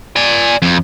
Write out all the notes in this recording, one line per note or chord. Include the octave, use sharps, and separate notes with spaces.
D5 G#5
F2